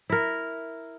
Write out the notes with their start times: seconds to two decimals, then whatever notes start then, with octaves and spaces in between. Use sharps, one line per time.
0.10 E4 A#4